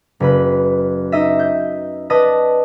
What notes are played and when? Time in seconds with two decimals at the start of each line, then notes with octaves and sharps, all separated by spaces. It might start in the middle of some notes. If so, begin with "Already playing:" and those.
0.20 F#1 B4 B5
1.12 D#4 D#5 E5
1.39 G6
2.10 B4 D5 D#5 A5 D#6